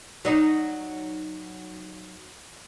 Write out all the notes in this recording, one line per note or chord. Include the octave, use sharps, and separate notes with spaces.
F#3 D#4